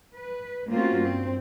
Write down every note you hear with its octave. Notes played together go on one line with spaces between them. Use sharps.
B4
A3 A#3 C4 C#4 F4 F#4
G2 C4